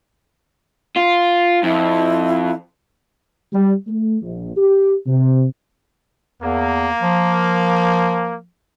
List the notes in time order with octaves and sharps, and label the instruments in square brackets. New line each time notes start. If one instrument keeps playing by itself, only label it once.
[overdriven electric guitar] F4
[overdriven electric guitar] F2 [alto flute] E4
[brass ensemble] G3
A3
A#1
G4
C3
[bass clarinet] E2 [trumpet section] A#3
[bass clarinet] F3